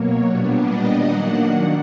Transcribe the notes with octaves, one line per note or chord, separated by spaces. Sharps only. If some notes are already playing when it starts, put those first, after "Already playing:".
Already playing: B2 F#3 A#3 C#5
A#2 G3 B3 D4
D#5
D#3 F#3 A#3 D4 F#5